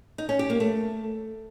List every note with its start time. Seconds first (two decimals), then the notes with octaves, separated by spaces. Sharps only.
0.18 D#4
0.29 C#4
0.39 G4
0.50 A#3
0.60 A3